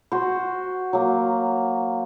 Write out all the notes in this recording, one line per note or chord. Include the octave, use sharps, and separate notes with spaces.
F#4 C5
F#3 A#3